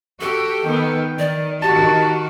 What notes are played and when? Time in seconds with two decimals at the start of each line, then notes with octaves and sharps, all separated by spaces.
0.21 F#4 G4 A4
0.65 D#3 B3 G5
1.19 D#3 D5
1.62 D#3 F#4 G4 A5